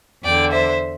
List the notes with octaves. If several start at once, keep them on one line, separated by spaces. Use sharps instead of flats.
E2 D3 D5 G5
C5 E5